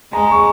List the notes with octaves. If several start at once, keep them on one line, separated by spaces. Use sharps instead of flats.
G#3 A#5
C#6